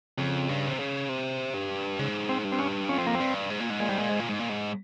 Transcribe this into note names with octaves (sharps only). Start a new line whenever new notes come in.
F2 C#3
G2
C3
C#3
C3
G2
G#2 C#3
C4
G2
C4
C#4
F2 C#4
C4
A#3
C4
G2
G#2
A#2
G#2
A#2 G#3
G#2 G3
A#2 G#3
G#2
A#2
G#2
A#2
G#2